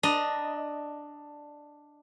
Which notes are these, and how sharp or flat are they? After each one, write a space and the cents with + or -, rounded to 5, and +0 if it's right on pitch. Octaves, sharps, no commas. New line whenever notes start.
D4 +5 D#5 +0 A#5 +30